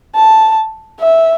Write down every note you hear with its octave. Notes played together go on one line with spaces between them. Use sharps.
A5
E5